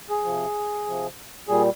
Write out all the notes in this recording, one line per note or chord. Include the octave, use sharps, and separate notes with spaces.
G#4
C3 F3
C3 F3
A#2 G3 G#4